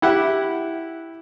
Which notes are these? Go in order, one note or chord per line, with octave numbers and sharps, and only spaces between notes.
E4 G4 F#5